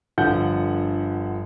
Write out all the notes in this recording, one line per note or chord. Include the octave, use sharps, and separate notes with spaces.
G1 D3 F3 F#5 G6